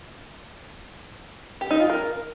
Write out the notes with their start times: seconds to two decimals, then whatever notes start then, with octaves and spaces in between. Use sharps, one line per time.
1.61 G4
1.71 D#4
1.80 F4
1.90 A#4